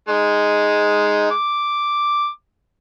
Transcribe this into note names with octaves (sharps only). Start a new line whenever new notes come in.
G#3 D#4
D6